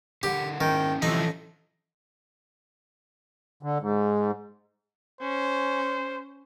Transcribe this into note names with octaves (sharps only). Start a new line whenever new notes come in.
D3 G4 A#4 F#5
G#2 D#3 C#4 D#4 E4 G5
C3 E3 F3 A3 C#4 D#4 A4
D3
G#2
C#4 C5